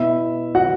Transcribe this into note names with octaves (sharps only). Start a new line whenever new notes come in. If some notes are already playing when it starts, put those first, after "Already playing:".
Already playing: B2 B3 E4 E5
F#4 F#5